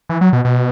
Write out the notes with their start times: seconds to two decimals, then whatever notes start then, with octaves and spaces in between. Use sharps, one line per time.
0.09 E3
0.21 F#3
0.33 B2
0.45 B2